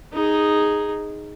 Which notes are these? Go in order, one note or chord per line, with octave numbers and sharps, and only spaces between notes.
D#4 G#4